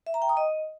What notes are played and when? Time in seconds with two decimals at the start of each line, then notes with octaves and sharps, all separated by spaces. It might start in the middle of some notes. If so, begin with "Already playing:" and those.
0.06 E5
0.14 A#5
0.22 G5
0.29 D#6
0.37 D#5